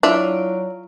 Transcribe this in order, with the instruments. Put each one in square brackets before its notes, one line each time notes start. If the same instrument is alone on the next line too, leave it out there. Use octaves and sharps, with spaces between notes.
[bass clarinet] F#3 [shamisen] D4 [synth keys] E4 D7 [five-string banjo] F4 E5